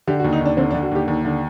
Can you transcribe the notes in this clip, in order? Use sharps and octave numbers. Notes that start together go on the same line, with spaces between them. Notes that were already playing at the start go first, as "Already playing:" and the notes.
D3 G4
F#4
D#2
D#4
D#2 D4
D3 C4
D4
D3
F#4
D#2 G4
D#2
D3